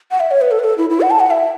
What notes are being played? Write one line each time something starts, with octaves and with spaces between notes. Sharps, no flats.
F#5
E5
C#5
B4
A4
B4
A4
E4
E4
F#5
A5
F#5
E5